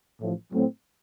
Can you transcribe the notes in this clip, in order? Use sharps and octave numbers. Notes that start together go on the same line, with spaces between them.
A1 A2 F3
A2 F#3 C4